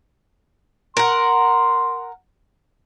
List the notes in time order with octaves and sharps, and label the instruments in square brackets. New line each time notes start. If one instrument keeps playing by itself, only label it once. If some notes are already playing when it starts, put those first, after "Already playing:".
[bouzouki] A#4 F#5 [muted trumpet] C6